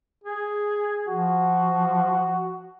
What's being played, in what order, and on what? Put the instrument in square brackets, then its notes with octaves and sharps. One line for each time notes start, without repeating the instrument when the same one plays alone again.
[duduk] G#4
[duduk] F3 [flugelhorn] F#4